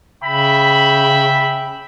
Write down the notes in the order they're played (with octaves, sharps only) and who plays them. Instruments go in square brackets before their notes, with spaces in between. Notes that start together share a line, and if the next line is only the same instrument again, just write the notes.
[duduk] C#3 [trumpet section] E5 G5 B5